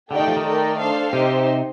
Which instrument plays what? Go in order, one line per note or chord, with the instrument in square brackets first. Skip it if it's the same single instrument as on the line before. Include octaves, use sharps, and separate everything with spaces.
[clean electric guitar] D3 [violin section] A3 D#4 G4 D5 G5
[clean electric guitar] D#3
F3
D#3
[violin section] A3 D#4 A#4 D5 G5
D4 A4 C5 F5
[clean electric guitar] C3 [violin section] D#4 G4 C5